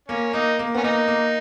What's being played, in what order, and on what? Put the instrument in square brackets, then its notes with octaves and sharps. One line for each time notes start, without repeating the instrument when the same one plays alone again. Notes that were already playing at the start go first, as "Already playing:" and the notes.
[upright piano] A#3 [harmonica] C#4
[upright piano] A#3 [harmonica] D#4
[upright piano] A#3
[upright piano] B3 [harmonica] C#4
[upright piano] A#3 [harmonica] D#4
[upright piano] A#3